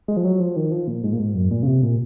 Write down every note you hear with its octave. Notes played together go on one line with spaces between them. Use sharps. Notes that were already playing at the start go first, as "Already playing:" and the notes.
G#3
F3
F#3
F3
D#3
F3
A#2
G#2
A#2
G#2
F#2
A#2
C#3
C3
A#2